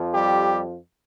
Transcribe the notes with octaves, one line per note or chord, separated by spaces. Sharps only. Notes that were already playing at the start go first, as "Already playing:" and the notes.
Already playing: F2 F3
G3 G4